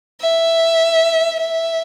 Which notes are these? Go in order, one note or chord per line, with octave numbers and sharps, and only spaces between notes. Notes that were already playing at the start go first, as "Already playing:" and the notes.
E5
E5